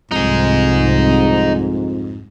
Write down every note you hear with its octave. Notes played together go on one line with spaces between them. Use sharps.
C2 F2 G#2 C3 D#4 G#4